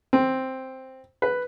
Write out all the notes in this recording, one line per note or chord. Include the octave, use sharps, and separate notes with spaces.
C4
B4